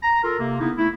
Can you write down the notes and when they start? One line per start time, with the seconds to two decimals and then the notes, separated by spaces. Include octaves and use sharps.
0.02 A#5
0.23 F4 A4 A#4
0.39 C3 A#3
0.60 C#3 B3 D#4 E4
0.77 A3 E4